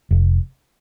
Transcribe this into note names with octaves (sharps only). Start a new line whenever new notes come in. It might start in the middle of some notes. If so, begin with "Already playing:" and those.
F1